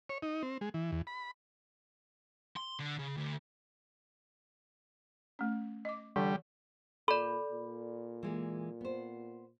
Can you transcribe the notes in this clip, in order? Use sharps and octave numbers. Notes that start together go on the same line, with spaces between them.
C#5
D#4
C4
G#3
E3
E2
B5
C6
D3
C#3
D2
A3 C#4
D#5 D6
D3 E3 G3
A#2 A4 D5 B5
A#2
E3 G#3 A#3
B3 C5